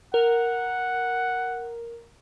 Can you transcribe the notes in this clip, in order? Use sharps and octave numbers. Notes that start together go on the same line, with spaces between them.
A#4 F#5